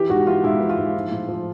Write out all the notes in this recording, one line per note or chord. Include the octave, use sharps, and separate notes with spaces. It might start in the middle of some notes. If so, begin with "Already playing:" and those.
Already playing: E3 G4
G#2 F#4
E3 F4
G#2 E4
E3
F4
G#2
F3
A2
F3